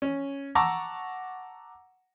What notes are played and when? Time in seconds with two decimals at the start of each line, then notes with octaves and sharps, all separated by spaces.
0.02 C#4
0.55 F#5 A5 A#5 C#6 D6 E6